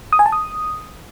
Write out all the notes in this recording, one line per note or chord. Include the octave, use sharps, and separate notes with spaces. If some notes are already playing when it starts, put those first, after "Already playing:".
D#6
G#5
A5
D#6